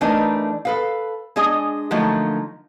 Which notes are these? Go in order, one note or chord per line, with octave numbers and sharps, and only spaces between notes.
E3 A3 D4 D#4 A#4 B4
A4 B4 F5
G#3 D4 G#4 D#5
D3 F3 F#3 A3 A#3 D#4